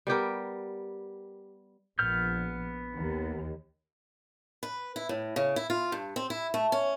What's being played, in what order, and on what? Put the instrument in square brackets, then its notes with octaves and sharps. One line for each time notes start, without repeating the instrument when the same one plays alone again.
[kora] G3 B3 G4 A#4
[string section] A#1 [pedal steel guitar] B3 F6 G6
[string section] D#2
[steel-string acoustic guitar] B4
E4
A2
C#3
E4
F4
G2
C4
E4
A3
C#4